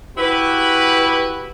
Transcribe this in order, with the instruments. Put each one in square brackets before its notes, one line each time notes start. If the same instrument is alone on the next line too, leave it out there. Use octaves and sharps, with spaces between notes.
[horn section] E4 F#4 G4 B4